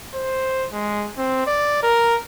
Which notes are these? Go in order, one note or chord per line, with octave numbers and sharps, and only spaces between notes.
C5
G#3
C4
D5
A#4